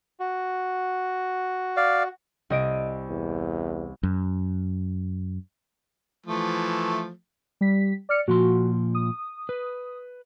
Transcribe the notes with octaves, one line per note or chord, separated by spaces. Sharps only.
F#4
D5 F5
C2 D#5 D7
E2
F#2
E3 F3 A3
G3 B6
D5 F6 C#7
A#2 F3 F#4 C6
D#6
B4